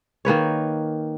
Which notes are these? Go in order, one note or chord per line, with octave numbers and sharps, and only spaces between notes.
D#3 A#3 B4 C#5